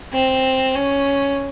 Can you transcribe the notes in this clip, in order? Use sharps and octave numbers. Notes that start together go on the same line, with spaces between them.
C4
C#4